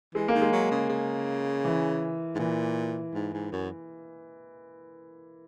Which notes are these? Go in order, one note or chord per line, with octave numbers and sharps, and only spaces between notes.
E3 G#3
A#3
D#3
G#3
F#3
C#3
C#3
E3
G#2
A#2 E3
G#2
G#2
F#2